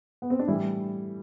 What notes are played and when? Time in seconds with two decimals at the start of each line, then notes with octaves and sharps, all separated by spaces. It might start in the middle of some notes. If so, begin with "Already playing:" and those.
0.22 B3
0.30 C4
0.39 D4
0.47 A2 E3 G3 E4